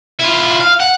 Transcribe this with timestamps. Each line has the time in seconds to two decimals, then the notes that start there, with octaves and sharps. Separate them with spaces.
0.20 E4 F4
0.60 F5
0.80 F#5